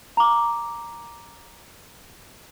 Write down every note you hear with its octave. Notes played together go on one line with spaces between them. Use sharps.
A#5 D6